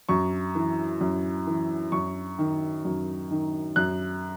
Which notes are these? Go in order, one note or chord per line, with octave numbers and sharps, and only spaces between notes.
F#2 C#6
E3
F#2
E3
F#2 C#6
D#3
F#2
D#3
F#2 F#6